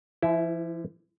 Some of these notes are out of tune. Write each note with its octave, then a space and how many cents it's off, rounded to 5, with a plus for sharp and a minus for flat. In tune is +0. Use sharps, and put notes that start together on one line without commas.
F3 -45 E4 +0